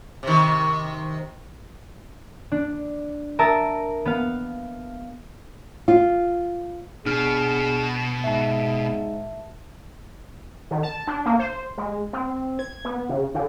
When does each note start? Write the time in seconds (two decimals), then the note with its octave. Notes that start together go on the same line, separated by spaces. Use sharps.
0.23 C3 D#3
2.52 D4
3.39 A#4 E5 A5 D#6 E6 A6
4.05 B3 F5
5.88 F4
7.06 B2 D4 G#4 F6
8.24 G#2 E5 A5
10.71 D#3
10.83 A5
11.07 D4
11.26 A#3
11.39 C5
11.78 G#3
12.13 C4
12.59 G#6
12.85 B3
13.09 C#3
13.35 D3